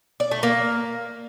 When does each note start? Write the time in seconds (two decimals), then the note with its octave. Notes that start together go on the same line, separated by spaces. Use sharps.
0.20 D5
0.31 A3
0.43 A#3